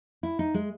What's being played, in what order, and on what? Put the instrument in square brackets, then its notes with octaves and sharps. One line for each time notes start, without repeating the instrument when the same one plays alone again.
[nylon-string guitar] E4
D#4
G#3